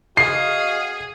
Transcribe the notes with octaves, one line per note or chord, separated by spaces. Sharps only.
F#4 G#4 D#5 F5 C7